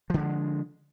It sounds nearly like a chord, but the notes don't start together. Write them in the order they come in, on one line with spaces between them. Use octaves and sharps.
F3 D3 G#3